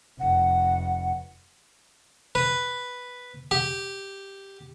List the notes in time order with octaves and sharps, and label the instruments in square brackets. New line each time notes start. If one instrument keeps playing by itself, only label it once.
[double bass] F1 [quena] F#5
[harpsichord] B4
G4